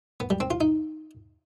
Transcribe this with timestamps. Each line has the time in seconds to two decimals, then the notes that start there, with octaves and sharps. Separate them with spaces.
0.20 B3
0.30 G3
0.40 C4
0.51 F4
0.61 D#4